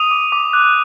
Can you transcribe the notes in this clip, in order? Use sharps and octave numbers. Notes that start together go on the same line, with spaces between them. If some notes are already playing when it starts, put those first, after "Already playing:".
Already playing: D#6 D#7 F7
D6
D6
F#6